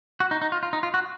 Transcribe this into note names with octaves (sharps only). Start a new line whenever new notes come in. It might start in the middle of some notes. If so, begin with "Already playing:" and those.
F#4
D#4
D#4
F4
F4
D#4
F4
F#4